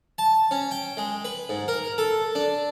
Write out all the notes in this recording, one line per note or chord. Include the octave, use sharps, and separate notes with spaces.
A5
C#4
G5
G#3
B4
G#2
A#4
A4
D4